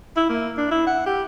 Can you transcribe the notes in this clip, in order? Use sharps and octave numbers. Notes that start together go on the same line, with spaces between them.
E4
A#3
D4
E4
F#5
G4